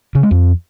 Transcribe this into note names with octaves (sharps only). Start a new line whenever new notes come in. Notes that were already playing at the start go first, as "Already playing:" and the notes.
C#3
G#3
F2